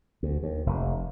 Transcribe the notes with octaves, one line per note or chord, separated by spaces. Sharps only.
D2
D#2
F1